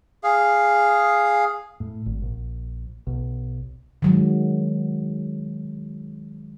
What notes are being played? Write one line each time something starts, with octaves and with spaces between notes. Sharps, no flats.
G#4 F5
A2
G#1
A#1
B1
D#3 F#3 G#3